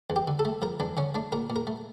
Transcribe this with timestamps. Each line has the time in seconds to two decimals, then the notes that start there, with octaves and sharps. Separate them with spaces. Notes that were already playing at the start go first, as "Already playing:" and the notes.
0.10 E2
0.16 G4
0.28 D3
0.39 A4
0.45 A3
0.62 F3 A#4
0.80 E2 D4
0.97 D3 C#4
1.15 A3 D4
1.32 A#2 A#4
1.50 A#2
1.56 A#4
1.67 A3